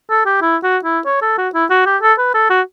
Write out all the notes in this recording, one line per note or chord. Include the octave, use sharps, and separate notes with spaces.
A4
G4
E4
F#4
E4
C#5
A4
F#4
E4
F#4
G4
A4
B4
A4
F#4